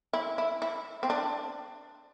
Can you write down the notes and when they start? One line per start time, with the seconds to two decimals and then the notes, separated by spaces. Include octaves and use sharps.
0.13 E4
0.38 E4
0.62 E4
1.03 C4
1.10 D4